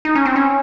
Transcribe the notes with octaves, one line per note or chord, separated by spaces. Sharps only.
D#4
C#4
C4
C#4